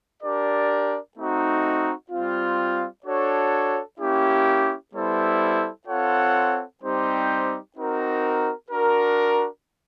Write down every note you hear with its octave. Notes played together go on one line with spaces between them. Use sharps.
D4 G4 A#4 D5
A3 C4 D#4 F#4
G3 C4 F4
D4 F#4 A4 C#5
A#3 C#4 E4 G4
G3 B3 E4 A4 C5
C4 F4 A4 C#5 F#5
G3 C4 D#4 G4 C5
C4 D#4 F#4 A#4
D4 F#4 A#4